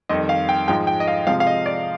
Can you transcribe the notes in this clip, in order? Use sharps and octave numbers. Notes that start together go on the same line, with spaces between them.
F2 D#3 G3 D#5
F5
G5
G#2 F3 G#3 G5
G5
D#5
F5
C3 F3 G#3 F5
F5
D#5
D5